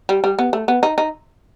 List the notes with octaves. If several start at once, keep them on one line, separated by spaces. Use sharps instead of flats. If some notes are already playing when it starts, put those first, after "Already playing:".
G3
G3
B3
A3
B3
D#4
D#4